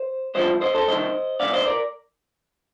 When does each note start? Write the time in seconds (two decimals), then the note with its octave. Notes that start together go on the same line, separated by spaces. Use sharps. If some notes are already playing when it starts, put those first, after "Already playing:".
Already playing: C5
0.35 C2 C3 F3 C5 D#5
0.61 C5 D#5
0.75 A4 C5
0.87 C2 C3 D#3 C5 D#5
1.40 C2 C3 D5 F5
1.53 C5 D#5
1.66 A#4 D5